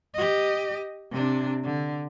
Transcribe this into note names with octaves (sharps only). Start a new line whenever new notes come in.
G4 D#5
C3 D4
D3